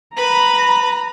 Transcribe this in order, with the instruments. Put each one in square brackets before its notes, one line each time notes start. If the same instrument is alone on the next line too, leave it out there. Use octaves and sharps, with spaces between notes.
[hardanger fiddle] B4 B5 [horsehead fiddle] A#5